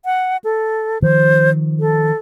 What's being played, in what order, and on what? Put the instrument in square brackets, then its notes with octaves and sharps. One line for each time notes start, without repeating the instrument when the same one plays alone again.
[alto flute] F#5
A4
[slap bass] D#3 F3 [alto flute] C5
[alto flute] A4